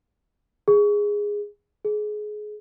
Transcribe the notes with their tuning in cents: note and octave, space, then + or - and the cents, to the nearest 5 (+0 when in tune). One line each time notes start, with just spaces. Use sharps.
G#4 -10
G#4 +25